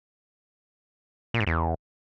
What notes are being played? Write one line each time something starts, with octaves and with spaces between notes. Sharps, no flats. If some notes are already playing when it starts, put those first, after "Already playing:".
A#2
G#2
E2